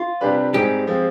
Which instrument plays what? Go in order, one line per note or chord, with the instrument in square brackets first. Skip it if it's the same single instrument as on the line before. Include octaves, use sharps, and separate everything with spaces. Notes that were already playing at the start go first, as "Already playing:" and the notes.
Already playing: [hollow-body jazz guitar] F4
[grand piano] C3 G3 D4 G4 B4
[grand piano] G#2 G3 C4 D#4 G#4 [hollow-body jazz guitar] G4
[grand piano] F3 G#3 C4